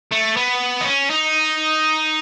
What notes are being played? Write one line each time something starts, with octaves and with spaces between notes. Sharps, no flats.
A3
B3
D#4
C#4
D#4